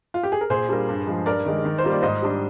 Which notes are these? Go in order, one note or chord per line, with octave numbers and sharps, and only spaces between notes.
F4
G4
G#4
A#4
A#2 G#4 C5
G3 D4 F4 A#4
G2
F3 G#3
G2 A#4 D5
D#3 G#3
D#3
C5
G3 A#3 F4
D5
G#2 C5 D#5
G3 D4